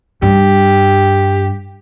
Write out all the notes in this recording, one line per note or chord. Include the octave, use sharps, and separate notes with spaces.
G2 G4